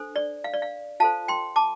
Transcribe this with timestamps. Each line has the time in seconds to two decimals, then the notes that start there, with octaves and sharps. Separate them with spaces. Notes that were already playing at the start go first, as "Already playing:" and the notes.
Already playing: D4 A4 C5
0.16 D5
0.44 F5
0.53 D5
0.62 F5
1.00 F4 A4 C5 F5 A5
1.28 G5 C6
1.56 A5 D6